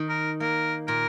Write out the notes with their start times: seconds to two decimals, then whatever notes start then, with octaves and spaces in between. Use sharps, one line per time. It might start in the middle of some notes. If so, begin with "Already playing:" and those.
Already playing: D#3
0.09 A#4
0.40 A#3 A#4
0.88 A#2 A#4